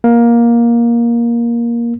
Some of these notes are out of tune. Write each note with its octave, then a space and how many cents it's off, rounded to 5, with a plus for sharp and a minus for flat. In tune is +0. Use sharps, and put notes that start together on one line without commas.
A#3 +15